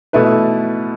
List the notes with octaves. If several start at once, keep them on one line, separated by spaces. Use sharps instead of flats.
B2 A3 E4 B4